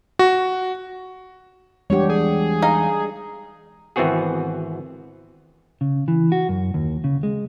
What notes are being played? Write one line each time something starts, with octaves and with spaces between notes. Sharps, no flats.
F#4
E2 G3 G#3 D4 G4 C#5 F#5
G#4
D#4 F5
G#1 E3 B3 C4 F#4 G#4
C#3
E3
F#4
F#2
D#2
C#3
G#3